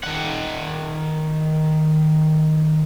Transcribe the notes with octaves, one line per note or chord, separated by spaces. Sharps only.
D#3 F#5